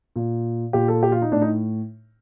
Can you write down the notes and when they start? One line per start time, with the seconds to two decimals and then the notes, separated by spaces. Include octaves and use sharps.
0.16 A#2
0.73 A#2 G4
0.88 A4
1.03 G4
1.12 F4
1.22 D#4
1.32 A2 D4
1.42 D#4